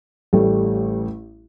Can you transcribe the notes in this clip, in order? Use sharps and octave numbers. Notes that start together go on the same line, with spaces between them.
A1 G3 A3